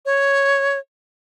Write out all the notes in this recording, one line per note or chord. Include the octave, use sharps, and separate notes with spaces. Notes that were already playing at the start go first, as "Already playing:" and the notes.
C#5